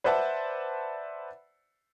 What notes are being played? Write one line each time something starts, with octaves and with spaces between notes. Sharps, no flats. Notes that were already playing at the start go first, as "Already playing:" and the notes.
B4 C5 D5 E5 F#5 A5